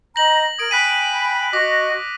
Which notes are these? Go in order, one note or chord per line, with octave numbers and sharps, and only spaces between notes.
D#5 A#5 G6 A#6 F#7
A#4 D#6 G#6 D7
G5 G#5 B5 F#6 B6 D#7
F#4 D#5 C#6 D6 A#6